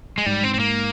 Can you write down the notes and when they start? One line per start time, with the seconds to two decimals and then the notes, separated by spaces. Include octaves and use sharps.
0.18 G#3
0.26 G#2 G3
0.44 C4
0.54 C4
0.59 A#3